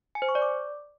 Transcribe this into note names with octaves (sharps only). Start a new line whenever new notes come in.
G#5
C5
C#6
D5
D6